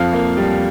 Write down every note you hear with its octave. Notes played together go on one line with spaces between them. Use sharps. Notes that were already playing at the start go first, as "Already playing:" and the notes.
Already playing: F2 F3 F5
A#3
G3